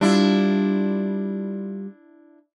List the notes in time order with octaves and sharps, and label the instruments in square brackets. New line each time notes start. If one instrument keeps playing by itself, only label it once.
[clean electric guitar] G3 F4 [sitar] D4 E4